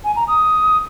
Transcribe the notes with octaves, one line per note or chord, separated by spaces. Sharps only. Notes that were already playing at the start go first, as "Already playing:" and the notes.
G#5
A#5
D#6